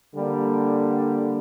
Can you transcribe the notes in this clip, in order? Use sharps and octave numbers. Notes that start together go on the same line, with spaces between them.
D3 G3 A#3